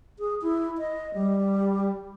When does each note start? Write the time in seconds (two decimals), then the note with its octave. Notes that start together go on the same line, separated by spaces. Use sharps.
0.19 G#4
0.42 E4
0.78 D#5
1.14 G3